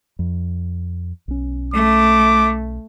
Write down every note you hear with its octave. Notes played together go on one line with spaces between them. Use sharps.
F2
B1 C#4
A3 D6